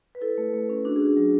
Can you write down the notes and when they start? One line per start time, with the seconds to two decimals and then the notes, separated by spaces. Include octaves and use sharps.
0.15 B4
0.21 E4 A4
0.38 A3
0.54 A3
0.69 C#4
0.85 D4 F#4
0.96 G#4
1.01 F#4
1.06 G#4
1.17 F#3